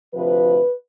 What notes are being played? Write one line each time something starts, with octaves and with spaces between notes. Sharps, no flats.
D2 C3 F3 B4